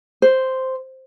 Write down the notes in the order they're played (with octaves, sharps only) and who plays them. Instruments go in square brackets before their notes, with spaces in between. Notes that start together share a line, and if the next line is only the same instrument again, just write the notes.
[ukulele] C5